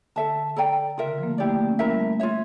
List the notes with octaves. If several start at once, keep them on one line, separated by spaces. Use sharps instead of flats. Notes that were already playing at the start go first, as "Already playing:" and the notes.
D3 A4 E5 A5
A4 D5 G5 A#5
C#3 F4 A#4 E5
D3
F3 A#3
A3
A#3 E4 G4 D5
A3
A#3
C#4
A#3 E4 A#4 E5 A#5
G3
A3
F4 C#5 E5